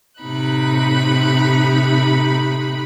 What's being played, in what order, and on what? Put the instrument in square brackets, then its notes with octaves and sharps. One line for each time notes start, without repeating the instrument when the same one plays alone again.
[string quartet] A2 C3 D#4 B5 F#6